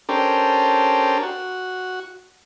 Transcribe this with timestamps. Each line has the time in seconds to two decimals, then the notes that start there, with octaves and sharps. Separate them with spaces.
0.09 C#4 D4 G4 A4 A#4 C5
1.23 F#4